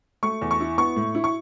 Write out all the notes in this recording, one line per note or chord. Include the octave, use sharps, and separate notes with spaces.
A3 C#6
E2
C#6
E4
B3 C#6
A2
E4
C#6